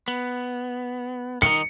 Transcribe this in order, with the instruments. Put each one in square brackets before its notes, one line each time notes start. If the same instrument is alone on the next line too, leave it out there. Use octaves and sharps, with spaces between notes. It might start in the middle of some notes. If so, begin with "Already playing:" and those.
[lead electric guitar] B3
[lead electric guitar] D#3 D#4 [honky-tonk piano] C#7